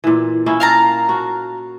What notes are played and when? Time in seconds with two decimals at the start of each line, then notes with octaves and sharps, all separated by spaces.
0.04 A#2 E3
0.46 A#3 C#4 E4
0.60 F5 A5 A#5
1.09 F#4